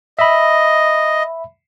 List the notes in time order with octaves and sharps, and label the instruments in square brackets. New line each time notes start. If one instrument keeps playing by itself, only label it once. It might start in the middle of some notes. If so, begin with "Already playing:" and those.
[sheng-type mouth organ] D#5 [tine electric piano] E5 B5